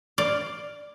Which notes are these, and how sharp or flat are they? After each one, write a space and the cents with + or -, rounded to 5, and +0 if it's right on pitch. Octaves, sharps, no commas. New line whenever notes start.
D5 +0 F5 +5